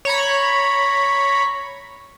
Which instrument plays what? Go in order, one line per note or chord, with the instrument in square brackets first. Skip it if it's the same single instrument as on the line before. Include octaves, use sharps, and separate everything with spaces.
[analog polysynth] C#5 A#5 B5